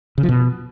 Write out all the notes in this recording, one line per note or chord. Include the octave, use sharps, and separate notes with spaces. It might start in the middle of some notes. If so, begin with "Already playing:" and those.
C#3
F3
B2